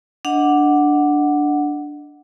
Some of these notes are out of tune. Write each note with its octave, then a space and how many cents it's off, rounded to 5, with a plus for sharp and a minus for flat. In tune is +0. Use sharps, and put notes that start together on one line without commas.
D4 +0 D#5 +20 F#5 +0